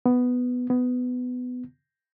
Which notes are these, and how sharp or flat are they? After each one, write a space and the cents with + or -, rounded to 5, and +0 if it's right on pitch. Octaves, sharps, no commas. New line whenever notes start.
B3 +5
B3 +15